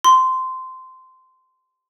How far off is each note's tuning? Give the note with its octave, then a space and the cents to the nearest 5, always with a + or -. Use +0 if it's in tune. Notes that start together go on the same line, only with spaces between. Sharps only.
C6 -15